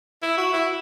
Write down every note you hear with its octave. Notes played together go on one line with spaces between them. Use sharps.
E4
F#4
E4